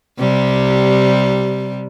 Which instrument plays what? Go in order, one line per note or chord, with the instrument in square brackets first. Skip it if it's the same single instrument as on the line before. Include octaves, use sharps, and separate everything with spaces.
[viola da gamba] C3 G3